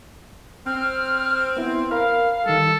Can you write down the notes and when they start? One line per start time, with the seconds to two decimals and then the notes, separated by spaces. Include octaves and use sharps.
0.66 C4 F6
1.57 B3 E4
1.91 A#4 F5 B5 F6
2.46 D#3 G3 A4